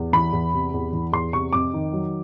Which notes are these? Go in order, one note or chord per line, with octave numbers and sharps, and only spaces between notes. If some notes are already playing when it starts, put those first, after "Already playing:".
Already playing: E2
E3 B5
E2
C3
E2
E3
E2 C6
C3 C#6
F2 D6
D#3
F#3